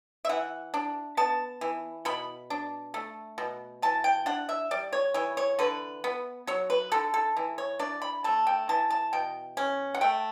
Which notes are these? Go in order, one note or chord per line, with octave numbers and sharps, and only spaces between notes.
E5
E3 F#5
D4
B3 A5
E3
B2 B5
D4
A3
B2
E3 A5
G5
D4 F#5
E5
G3 D5
C#5
E3 C#5
C#5
D3 B4
B3
F#3 C#5
B4
D3 A4
A4
E3
C#5
D4 D5
B5
A3 A5
G5
E3 A5
A5
B2 G5
C#4
F#5
A3 G5